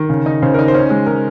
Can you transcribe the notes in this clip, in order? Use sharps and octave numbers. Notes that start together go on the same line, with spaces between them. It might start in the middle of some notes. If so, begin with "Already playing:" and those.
Already playing: D#3
C#3
D#4
C#3 C5
D#4 A#4
C5
C#4
G#3
G#3 A#4